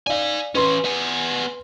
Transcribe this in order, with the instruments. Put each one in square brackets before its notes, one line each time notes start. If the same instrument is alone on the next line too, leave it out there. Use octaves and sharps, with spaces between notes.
[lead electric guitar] D#4 G#5 [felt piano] D5 F5
[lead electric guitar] E3 C#4 [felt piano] B4 C6
[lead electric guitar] B3 G#5